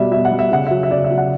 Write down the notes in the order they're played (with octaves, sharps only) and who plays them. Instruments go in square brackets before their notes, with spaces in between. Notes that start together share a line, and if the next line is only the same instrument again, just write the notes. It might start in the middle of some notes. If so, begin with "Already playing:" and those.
Already playing: [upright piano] B2 G3 D5 E5
B2 E5
F#5
G3
E5
C#3 F#5
F#3 E5
E5
C#3 D5
E5
F#3
F#5